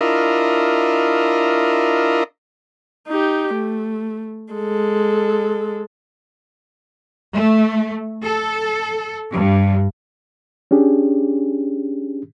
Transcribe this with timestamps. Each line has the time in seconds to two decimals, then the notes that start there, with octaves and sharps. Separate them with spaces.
0.01 D4 E4 F4 A#4 D#5
3.08 D#4 G4
3.55 A3
4.53 G#3 A4
7.33 A3
8.23 A4
9.31 G2
10.71 C#4 D4 G4 G#4